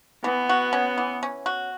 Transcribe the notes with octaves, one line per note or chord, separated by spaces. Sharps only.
E3 B3
F#4
C#4
E3
C#4
F#4